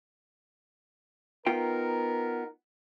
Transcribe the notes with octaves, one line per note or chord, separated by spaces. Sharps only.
B3 D#4 F4 A#4 G5